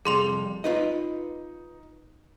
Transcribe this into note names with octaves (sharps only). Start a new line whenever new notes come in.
F2 C3 G3 G#4 C6 F7
D#4 F4 B4 D#5